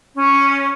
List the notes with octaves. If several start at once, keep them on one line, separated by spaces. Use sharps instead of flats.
C#4